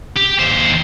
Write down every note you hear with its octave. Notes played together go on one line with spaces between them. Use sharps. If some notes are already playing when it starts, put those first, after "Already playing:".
G4
D#2 C5